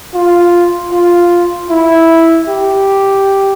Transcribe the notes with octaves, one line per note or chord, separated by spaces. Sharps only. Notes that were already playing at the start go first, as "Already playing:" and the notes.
F4
F4
E4
G4